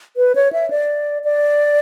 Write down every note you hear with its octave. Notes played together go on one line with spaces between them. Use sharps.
B4
C#5
E5
D5
D5